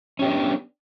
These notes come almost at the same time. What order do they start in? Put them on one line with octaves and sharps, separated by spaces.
C#4 G4 B3 D4